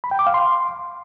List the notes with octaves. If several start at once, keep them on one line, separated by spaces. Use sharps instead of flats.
B5
G5
D6
F5
C6